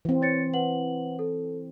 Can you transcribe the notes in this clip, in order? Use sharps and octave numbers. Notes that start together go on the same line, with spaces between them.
E3 C4
C#5 A6 C#7
B4 F#5 F#7
A4